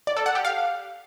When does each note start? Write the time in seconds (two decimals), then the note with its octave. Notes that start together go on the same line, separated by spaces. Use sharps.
0.07 D5
0.17 A4
0.26 F#5
0.35 G4
0.45 F5